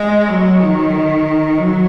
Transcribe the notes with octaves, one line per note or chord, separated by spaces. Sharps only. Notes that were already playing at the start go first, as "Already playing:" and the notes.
Already playing: G#3
F#3
D#3
F#3